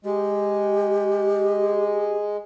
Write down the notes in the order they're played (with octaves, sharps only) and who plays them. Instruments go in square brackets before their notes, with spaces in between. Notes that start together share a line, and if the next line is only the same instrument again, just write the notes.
[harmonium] G#3 [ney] G4